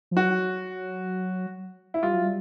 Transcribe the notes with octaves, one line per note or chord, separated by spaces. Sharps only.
F3
F#3 F#4
E4
G3 F4
F#3
G3